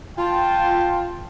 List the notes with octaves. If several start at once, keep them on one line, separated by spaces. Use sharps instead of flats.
F4 G5 A5